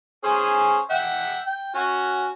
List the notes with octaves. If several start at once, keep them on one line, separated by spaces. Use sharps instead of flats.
C#4 G#4 C5
E5 F#5 G5
G5
C#4 F#4